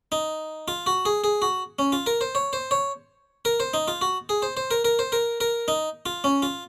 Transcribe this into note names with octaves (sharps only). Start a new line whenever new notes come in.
D#4
F4
F#4
G#4
G#4
F#4
C#4
F4
A#4
C5
C#5
C5
C#5
A#4
C5
D#4
F4
F#4
G#4
C5
C5
A#4
A#4
C5
A#4
A#4
D#4
F4
C#4
F4